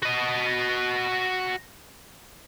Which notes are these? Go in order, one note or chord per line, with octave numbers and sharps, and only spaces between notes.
F#4 D#5